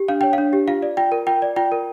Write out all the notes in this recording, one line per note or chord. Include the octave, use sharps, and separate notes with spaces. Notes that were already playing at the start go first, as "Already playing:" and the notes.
Already playing: G4
D4 F5
C#5 G5
D4 F5
G4
F4 F5
D5
F4 G5
A#4
F4 G5
D5
F4 G5
A#4